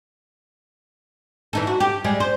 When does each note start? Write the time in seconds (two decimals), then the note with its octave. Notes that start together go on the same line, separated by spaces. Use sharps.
1.53 E3 D#4 A4
1.67 F#4
1.80 G4
2.04 G3 G#3
2.20 C5